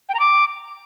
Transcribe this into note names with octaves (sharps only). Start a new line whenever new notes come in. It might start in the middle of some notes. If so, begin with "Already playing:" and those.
G5
A#5
D6